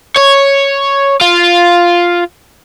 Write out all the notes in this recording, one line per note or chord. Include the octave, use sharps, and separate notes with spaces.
C#5
F4